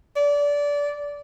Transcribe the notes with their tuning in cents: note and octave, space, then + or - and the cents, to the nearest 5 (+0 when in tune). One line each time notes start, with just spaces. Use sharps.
D5 -20